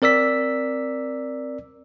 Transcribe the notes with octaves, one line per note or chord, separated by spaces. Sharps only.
C4 A#4 D5 E6 B6